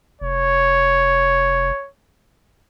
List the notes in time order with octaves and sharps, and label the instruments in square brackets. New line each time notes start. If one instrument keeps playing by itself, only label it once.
[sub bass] F1 [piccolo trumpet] C#5